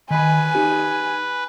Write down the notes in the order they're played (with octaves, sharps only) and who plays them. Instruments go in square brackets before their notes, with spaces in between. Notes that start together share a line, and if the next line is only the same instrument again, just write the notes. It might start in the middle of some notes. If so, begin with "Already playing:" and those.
[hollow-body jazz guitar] D#3 B5 [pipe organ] B4 [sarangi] G#5
[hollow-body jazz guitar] D#4 G4